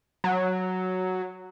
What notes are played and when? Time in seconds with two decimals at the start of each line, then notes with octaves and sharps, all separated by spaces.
0.24 F#3